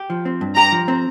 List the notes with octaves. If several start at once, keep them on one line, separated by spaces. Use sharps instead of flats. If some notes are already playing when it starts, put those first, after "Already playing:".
Already playing: G4
F3
C4
G2
G4 A#5
F3
C4